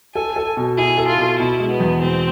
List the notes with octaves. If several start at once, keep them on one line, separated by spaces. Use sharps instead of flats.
A4 G#5
A4
B2
E4 G#4
A4
F4
B2
B2 E4
G#3
B3
E2
B2 C4